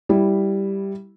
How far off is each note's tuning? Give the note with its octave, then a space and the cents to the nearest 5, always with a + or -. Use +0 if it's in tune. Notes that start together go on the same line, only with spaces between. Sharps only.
G3 +0 E4 +0